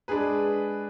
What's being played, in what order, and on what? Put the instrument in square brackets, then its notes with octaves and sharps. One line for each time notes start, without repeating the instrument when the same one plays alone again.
[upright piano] G#3 D4 G#4 B4